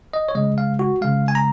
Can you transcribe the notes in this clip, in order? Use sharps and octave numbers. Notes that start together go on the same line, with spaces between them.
D#5
C#5
C#3 G#3 D#5
F5
F#4
C#3 G#3 F5
G#5
A#5